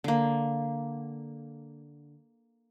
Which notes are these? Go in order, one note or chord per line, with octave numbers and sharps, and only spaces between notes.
D3 A#3